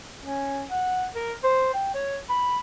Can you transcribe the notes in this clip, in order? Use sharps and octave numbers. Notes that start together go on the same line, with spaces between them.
C#4
F#5
A#4
C5
G5
C#5
B5